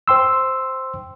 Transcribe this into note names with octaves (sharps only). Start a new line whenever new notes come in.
C5 G5 C6 E6